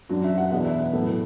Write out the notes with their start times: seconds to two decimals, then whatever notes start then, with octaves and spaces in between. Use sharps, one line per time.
0.09 F#2 F#3 D4 F#4
0.24 E5
0.37 F#5
0.51 E2 B2 B3 D4 F#5
0.65 E5
0.93 A2 F#3 B3 A4